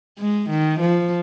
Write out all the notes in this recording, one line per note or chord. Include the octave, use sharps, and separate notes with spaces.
G#3
D#3
F3